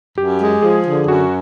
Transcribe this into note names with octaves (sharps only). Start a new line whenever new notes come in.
F#2 G4
G#3
F3 G#4
D3
F#2 F#4